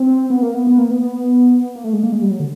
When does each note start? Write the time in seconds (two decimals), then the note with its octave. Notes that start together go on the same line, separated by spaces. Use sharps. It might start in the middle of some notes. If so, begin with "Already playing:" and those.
Already playing: C4
0.30 B3
0.42 A#3
0.55 B3
0.67 B3
0.78 A#3
0.91 B3
1.02 B3
1.76 A#3
1.84 A3
1.93 G#3
2.03 A#3
2.12 G#3
2.22 G3
2.31 F#3
2.40 D3